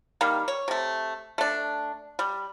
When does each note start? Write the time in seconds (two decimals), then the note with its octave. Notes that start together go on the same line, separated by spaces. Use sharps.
0.21 D#3 G3 A#3
0.48 C#5
0.68 C3 A3
1.38 A3 D4
2.19 G3